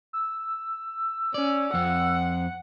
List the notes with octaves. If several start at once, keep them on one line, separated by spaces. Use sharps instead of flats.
E6
C#4 D5
F2 C4 F#5